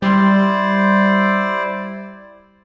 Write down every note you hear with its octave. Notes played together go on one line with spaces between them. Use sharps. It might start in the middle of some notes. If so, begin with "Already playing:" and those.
G3 E4 C5 D5 C6